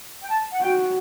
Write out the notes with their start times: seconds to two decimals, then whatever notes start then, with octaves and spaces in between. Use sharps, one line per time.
0.22 G5
0.29 A5
0.52 F#5
0.61 F#4 G5